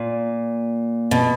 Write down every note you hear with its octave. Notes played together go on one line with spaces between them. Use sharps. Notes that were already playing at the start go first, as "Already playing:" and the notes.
Already playing: A#2
B2